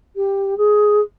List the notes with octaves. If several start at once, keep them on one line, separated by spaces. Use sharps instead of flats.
G4
G#4